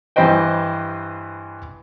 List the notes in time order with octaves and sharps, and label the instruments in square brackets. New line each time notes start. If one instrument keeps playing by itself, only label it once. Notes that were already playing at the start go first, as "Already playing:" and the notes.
[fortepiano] G2 E3 B4 C5 D#5 G5